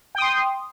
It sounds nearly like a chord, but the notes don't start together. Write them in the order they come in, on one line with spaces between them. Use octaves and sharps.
G5 D#6 C6